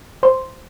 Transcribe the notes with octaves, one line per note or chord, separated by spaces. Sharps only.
C5 C6